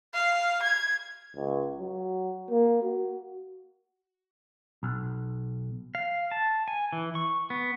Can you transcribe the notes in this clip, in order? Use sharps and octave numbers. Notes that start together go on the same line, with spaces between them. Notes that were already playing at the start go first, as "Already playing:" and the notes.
F5
G#6
C#2
F#3
A#3
F#4
B1
F5
A5
G#5
E3
C#6
B3